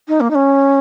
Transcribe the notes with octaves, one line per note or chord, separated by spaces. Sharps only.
D#4
A#3
D#4
C#4